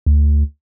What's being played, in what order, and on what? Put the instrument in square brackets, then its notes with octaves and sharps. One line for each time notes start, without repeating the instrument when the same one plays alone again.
[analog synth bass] D2